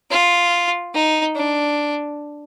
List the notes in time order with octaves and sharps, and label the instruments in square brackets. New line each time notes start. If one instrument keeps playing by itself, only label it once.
[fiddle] F4
D#4
D4